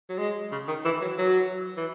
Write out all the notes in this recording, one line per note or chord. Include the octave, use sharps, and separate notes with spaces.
F#3
G#3
C#3
D#3
E3
F#3
F#3
E3